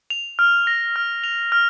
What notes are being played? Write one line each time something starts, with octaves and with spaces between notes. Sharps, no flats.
F7
F6
A#6
F6
F7
F6